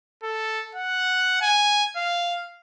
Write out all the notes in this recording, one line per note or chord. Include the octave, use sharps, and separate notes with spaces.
A4
F#5
G#5
F5